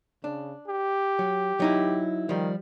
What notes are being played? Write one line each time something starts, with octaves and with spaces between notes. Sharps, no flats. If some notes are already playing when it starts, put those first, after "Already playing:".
C#3 D4
G4
F#3
F#3 D#4 E4
D#3 F3 G3